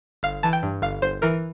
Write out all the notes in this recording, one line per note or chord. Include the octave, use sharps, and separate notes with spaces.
G1 F5
E3 A5
G5
G2
G1 F5
G1 C5
E3 A#4